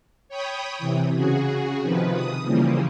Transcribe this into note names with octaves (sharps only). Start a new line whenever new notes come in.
C#5 G5 B5 D#6
C3 E3
C#3 F#4 G#4
C3 D#3 F3 B4
D#6
C#3 E3 F3 G3 A#3